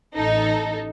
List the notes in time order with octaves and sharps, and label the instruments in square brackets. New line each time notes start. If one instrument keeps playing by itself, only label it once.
[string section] A1 D#4 A4